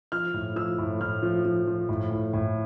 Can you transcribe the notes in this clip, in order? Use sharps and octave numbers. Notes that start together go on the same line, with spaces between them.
F3 F6
A2
F3 E6
A2
A2 F6
F3
F3
F3
A2
A2
A2